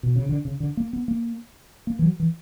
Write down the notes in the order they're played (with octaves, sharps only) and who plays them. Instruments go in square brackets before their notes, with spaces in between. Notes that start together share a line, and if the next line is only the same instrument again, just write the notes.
[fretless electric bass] B2
C#3
D3
C#3
D3
A#3
B3
A#3
A#3
E3
F#3
E3